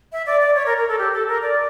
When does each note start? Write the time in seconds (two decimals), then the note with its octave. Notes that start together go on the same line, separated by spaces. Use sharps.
0.12 E5
0.26 D5
0.41 D5
0.55 C#5
0.66 A#4
0.78 A#4
0.88 A4
0.99 G4
1.13 A4
1.28 A#4
1.42 D5